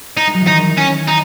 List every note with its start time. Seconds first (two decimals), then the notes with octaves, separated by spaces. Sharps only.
0.17 D#4
0.27 G#3
0.34 F#3
0.41 E3
0.47 D#3 D#4
0.78 C#4
1.08 D#4